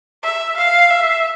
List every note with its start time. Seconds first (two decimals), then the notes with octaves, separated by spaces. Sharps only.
0.23 E5
0.56 F5
0.90 E5